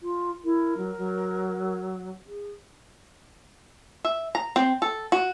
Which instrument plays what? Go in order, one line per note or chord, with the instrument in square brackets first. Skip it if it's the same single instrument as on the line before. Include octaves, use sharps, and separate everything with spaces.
[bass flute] F4
[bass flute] E4 [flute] A#4
[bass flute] F#3
F#3
[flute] G#4
[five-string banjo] E5
A#5
C4
A4
F#4